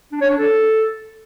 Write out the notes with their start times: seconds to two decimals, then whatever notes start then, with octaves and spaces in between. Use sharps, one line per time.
0.12 D4
0.21 C#5
0.30 D4
0.38 A4